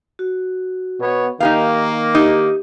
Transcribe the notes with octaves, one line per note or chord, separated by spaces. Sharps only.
F#4
B2 B3 C#5
D#3 A#3 D#4 G4 F5 A#5
D#4 G4